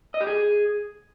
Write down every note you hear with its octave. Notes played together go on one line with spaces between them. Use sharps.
D#5
G4
G#4